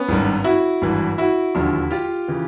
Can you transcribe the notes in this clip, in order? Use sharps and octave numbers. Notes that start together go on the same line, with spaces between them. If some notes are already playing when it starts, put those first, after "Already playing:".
Already playing: B3 C#4
G#1 G2 D#3
E4 F#4
G#1 G2 E3
E4 F#4
E1 D#2 D3 F3
F4 G4
C#3 E3